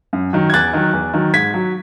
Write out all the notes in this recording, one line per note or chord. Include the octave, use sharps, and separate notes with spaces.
F#2
D#3 F#3
G#6
E2 F#6 A6
D#3 F#3
E2
D#3 F#3
G#2 G#6 B6
F#3